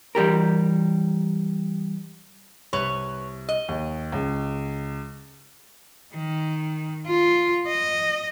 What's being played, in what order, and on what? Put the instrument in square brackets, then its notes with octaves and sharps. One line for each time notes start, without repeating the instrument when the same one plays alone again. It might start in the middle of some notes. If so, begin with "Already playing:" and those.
[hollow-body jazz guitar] E3 G3 G4 A#4
[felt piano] C2 [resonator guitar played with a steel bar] B4 C#5
[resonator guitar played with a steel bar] D#5
[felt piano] D#2
C#2
[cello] D#3
F4
D#5